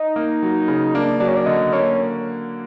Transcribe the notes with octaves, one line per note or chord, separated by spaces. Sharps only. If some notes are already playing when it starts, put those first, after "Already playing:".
Already playing: D#4
A#3
F#3
C#3
A#3 D4
F#3 D4
C#4
D4
D3 D#4
A#3 C#4